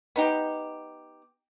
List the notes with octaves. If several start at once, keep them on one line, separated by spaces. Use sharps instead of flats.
B3 D#4 G4